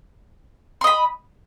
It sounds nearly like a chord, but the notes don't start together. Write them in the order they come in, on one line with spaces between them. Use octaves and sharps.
C6 D#5 B5